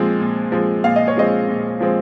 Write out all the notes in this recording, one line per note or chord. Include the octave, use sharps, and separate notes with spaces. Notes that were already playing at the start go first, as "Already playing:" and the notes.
Already playing: A#2 F3 G#3 C4
A#2
F3 G#3 C4
A#2 F5
D#5
C#5
F3 G#3 C4 D#5
A#2
F3 G#3 C4